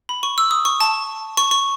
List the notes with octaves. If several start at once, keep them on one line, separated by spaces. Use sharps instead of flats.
B5
C#6
E6
D#6
C#6
A5
C#6
C#6